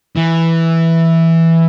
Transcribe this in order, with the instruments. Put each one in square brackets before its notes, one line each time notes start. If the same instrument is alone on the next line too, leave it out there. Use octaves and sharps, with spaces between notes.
[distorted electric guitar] E3